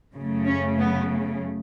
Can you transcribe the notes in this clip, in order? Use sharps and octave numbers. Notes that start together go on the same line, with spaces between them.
F#2 C#3 A3
C#4
B3